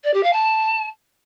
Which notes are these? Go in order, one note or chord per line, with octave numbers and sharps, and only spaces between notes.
D5
G4
F5
A5